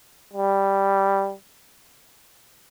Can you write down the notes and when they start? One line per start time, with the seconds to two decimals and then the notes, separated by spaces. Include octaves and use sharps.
0.34 G3